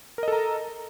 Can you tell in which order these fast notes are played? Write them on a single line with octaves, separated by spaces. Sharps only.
A#4 D#5 A4 A#5